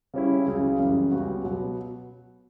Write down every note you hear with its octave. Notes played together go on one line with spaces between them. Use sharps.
C#3 G3 C#4 E4
C#2 C#3 F#3
F#2 C#3 E3 G3
C#2 C#3 G3 B3 F#4
B2 F#3 B3 F#4